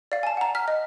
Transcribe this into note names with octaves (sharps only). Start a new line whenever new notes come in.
D5 F5
G#5 A5
F#5 A#5
F6 B6
D#5